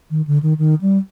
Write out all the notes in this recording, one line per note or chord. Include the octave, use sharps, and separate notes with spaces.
D#3
D3
D#3
D#3
G3